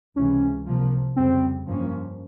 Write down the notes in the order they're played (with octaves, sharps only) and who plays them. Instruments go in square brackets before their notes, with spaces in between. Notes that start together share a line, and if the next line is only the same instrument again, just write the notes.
[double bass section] C#2 C3 E3 G#3 [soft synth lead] C#4
[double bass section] C2 C3 F3 A#3
[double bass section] F2 C#3 G3 [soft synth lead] C4
[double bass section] G2 F3 A#3 C#4